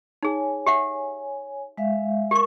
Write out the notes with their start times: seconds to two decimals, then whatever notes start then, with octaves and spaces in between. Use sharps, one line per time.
0.23 D#4 G#4 C#5 G#5
0.66 G4 E5 F#5
1.78 G#3 E5 F5
2.31 G4 A#4 C#6